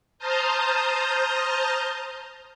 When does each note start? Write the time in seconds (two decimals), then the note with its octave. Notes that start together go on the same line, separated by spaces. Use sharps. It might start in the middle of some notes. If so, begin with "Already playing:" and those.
0.18 C5 A5 A#5 D#6 F6 G6